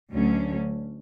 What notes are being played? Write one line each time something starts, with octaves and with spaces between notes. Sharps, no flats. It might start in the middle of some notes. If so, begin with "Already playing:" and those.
D2 D3 F#3 C#4